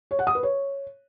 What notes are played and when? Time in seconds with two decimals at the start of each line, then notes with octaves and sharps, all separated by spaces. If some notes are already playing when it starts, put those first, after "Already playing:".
0.11 C#5
0.19 F#5
0.27 D#6
0.35 B4
0.43 C#5